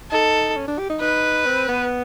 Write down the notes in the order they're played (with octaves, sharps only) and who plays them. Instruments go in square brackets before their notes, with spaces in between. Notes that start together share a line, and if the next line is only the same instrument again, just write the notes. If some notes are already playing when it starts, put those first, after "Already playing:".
[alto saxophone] D#4 [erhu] A4
[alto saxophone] C#4
D4
G4
D#4
[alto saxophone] D#4 [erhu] B4
[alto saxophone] C4
B3